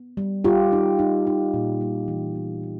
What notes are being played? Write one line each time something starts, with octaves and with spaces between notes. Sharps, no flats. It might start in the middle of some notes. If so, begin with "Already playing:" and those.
Already playing: B3
G3
G3 F4 G4
D#4
D#4
D#4
A#2
G3
E3
B3
E3